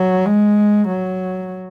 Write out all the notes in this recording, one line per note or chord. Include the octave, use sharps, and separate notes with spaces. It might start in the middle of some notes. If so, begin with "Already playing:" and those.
Already playing: F#3
G#3
F#3